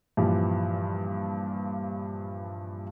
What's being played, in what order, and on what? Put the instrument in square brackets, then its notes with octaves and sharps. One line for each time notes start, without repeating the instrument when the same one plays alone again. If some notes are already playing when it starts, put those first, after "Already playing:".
[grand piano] G2 A#2 E3 F3 G4